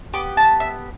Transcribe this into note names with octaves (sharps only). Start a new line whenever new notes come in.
B3 G4 D6
A5
E5